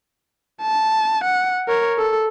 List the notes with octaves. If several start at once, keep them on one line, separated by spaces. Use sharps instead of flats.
A5
F#5
A#4 C#5
A4